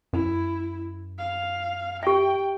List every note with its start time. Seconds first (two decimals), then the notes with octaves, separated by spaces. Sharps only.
0.13 F#2 E4
1.19 F5
2.03 G4 E5 G5